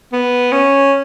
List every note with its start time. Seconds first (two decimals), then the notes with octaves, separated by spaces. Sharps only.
0.13 B3
0.52 C#4